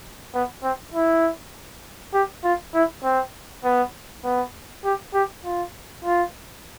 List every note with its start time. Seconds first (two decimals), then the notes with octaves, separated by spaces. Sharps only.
0.34 B3
0.63 C4
0.94 E4
2.14 G4
2.44 F4
2.74 E4
3.03 C4
3.64 B3
4.24 B3
4.84 G4
5.14 G4
5.45 F4
6.05 F4